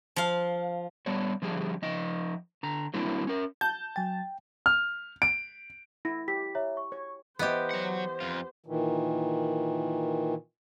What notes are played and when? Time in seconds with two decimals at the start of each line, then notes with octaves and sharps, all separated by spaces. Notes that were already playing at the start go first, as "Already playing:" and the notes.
0.16 F3 F5
1.06 G3 B3 D4 C#5
1.42 D3 F3 G3 G#4
1.82 F3 D#4 D#5
2.63 D3 A#5
2.94 F#3 G3 A#3 C4 D4 E4
3.27 C#4 A#4
3.61 A5 G6
3.96 F#3 G5 G#5 A6
4.66 F6
5.22 D7
6.05 E4 A#6
6.28 G4 B6
6.55 C#5 E5 A#5
6.77 C#6
6.92 C#5
7.39 E3 B3 G4 C5 D#5 E5
7.71 F#3 F#5
8.20 F2 F4
8.66 A#2 D#3 E3